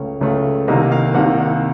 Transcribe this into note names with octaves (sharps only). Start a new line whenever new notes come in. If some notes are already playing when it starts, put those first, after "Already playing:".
Already playing: C#2 C#3 A3 C#5
C#2 C#3 A3
C2 C3 D#3 A#3 D#5
F5
C2 C3 D#3 A#3 F#5